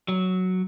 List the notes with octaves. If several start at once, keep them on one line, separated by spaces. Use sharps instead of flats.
F#3